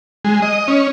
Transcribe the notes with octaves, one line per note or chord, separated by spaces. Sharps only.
G#3
D#5
C#4